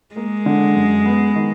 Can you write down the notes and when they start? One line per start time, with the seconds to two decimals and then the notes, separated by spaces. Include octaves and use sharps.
0.15 G#3 A#3
0.46 D3
0.75 F#2
1.06 B3
1.36 D#3